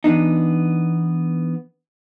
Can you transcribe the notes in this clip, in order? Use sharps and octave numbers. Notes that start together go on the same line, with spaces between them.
E3 B3 D4 D#4